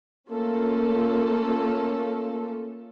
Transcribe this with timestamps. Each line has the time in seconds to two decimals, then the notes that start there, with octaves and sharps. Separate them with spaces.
0.29 A3 A#3 C#4 F4 A4